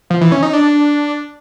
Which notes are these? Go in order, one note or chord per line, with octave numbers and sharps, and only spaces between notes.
F3
E3
C#4
D#4
D4